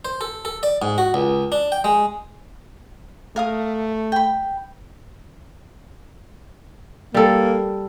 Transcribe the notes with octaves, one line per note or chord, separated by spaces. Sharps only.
C5
A4
A4
D5
G#2
F#4
C#2
D4
G5
G#3
A3 A#4 F5 D#6
G5 B5
G3 A#3 A4